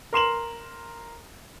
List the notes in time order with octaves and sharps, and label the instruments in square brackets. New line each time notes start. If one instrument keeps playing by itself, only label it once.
[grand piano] A#4 C6 E7 F#7